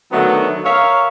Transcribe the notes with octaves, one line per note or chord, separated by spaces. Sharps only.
D3 D#3 F#3 A3 B3 F#4
A#4 C#5 E5 F5